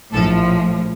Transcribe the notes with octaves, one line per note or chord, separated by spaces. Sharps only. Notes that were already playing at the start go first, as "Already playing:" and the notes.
A#1 A2 F3 A4